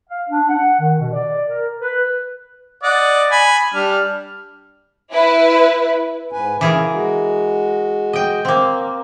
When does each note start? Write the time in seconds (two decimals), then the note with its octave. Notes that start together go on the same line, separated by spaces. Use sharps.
0.08 F5
0.28 D4
0.49 F#5
0.80 D#3
0.99 B2
1.12 D5
1.48 A#4
1.80 B4
2.83 D5 D#5 F#5
3.31 G#5 B5
3.74 G3 D4 F6
5.13 E4 B4
6.32 G#2 B4 G#5
6.61 C#3 E3 G#4 A#4
6.92 G#3 F#4
8.13 D#5 G5
8.45 A#3 C4